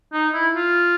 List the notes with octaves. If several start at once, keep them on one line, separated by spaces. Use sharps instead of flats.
D#4
E4
F4